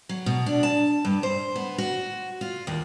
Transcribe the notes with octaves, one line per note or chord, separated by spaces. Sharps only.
F#3
B2
D4
A5
G2
C5
B3
F#4
F4
D#2